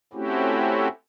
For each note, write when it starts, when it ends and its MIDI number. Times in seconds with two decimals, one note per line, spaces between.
0.13 0.88 57
0.13 0.88 60
0.13 0.88 61
0.13 0.88 64
0.13 0.88 66
0.13 0.88 67